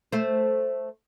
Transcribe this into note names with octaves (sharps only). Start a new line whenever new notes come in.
A3 C5